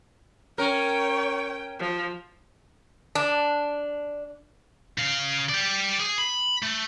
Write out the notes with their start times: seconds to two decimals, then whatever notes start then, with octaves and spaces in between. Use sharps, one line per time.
0.58 C#4 A#4 C#5 G5
1.79 F3
3.15 D4
4.98 C#3 F5
5.49 G4 D5
6.00 G#4
6.18 B5
6.62 A3